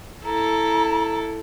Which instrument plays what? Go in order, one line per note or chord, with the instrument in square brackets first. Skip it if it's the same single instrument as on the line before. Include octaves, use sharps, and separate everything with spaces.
[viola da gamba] E4 A4 [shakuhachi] A#5